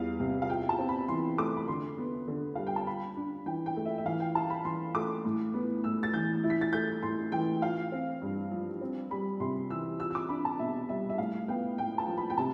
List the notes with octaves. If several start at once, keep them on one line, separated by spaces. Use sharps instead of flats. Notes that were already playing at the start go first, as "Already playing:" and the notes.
Already playing: E2 G3 F5
C3
F5
F4 G5
A5
C4
B5
E3 C6
A3 D6
B5
D3 C6
B3
D3
G3 F5
G5
A5
F4 B5
D4
E3 G5
G5
A3
E5
E5
E3 F5
G5
E4 A5
B5
E3 C6
A3 D6
A2
B3
A2 E6
A6
E3 G6
E4
B6
A6
A3 G6
A2 C6
E3 G5
F4 F5
C4
G2
F3
C4
G3 B5
C3 C6
E3 E6
F4 E6
E6
D6
D4 B5
A5
B2 E5
G3 E5
E5
A2 F5
B3 G5
A2 G5
A5
F3
B5
G5
C3 A5